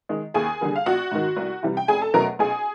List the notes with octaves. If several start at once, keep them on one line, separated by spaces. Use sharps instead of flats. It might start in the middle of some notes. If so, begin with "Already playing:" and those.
D#3 G#3
D#2 G#4 G#5
D3 G3 A#3
F5
A#1 F#4 F#5
G#2 D#3
C2
C3 E3 G3
G5
F1 G#4 G#5
A4 A5
E2 B2 F#3 A3 A#4 A#5
B1 G#4 G#5